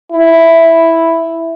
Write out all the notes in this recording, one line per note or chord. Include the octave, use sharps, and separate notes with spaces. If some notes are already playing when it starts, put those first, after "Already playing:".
E4